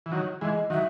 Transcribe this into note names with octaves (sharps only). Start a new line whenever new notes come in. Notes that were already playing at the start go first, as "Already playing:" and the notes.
E3
D#3 F#3 C#5
E3 G#3 D#5
D#3 F#3 E5